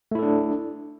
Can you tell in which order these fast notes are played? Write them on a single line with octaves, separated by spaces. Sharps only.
A3 E4 A4 D4